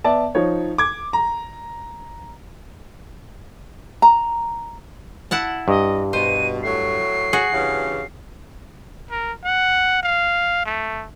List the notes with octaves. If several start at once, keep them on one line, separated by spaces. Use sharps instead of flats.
B3 D5 E5 A5
F3 D#4 C#5
D6 G#6
A#5
A#5
E4 F#5 A5
G2 D#5
B2 C5 D#7
A2 F#3 A3 C7
F#4 G#4
G2 C#3 E3
A#4
F#5
F5
A3